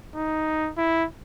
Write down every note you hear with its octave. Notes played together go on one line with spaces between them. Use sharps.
D#4
E4